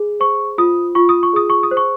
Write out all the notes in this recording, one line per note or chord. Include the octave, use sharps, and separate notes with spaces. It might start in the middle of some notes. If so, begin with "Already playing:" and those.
Already playing: G#4
C5 C#6
F4 D#6
F4 C#6
D#6
C#6
G#4 D#6
C#6
D#6
C5
C#6